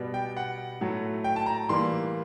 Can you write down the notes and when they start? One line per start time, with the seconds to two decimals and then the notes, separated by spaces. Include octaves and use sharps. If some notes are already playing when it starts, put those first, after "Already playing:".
Already playing: B2 G3 B3
0.14 G5
0.37 F#5
0.81 A2 F#3 A3
1.24 G5
1.36 A5
1.46 A#5
1.69 A2 E3 G3 A#3 C6